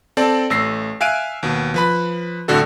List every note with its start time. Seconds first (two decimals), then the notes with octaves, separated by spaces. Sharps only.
0.17 C4 A4 D5 A5
0.50 A1 A3 E6 A#6 C7
1.01 E5 F5 G#5 F#6 D7 D#7
1.43 D#2 B2
1.74 F3 B4 B5
2.48 C2 A2 D3 F#4 A4